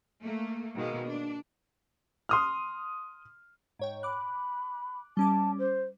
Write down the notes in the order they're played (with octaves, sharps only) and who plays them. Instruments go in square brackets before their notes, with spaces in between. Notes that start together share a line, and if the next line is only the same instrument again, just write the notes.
[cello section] A3 A#3
B2 D#3 G#3 A#3 B3
D4
[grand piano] C6 D#6 F6
[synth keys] G#2 C#5 G5
[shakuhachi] B5 [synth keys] D6 F#6
[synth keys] G3 C#4 D6 [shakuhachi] A5
[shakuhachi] C5